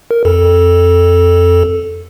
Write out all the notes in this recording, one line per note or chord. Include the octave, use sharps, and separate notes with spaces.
A#4
F2 A4